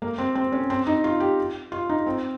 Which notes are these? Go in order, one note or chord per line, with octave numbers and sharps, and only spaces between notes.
A#3
C4
C4
C#4
C4
D#4
F4
G4
F4
D#4
C4